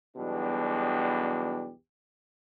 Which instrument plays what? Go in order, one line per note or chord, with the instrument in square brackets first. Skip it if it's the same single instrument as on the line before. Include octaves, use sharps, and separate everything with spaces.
[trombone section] B1 E2 B2 G3 D4 G4